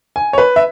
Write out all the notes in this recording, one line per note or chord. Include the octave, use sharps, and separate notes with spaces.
G#5
C#5
B4
E5